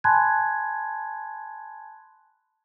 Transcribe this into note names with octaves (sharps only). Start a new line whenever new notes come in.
G#5 A5 B5 C6 F#6 G#6